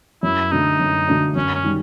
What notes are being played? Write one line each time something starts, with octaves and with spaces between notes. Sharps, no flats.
F#2 E4
D3 F#3 A3 D4 D#4
F#2
D3 F#3 A3 D4
F#2 C#4
C#4
D#3 G3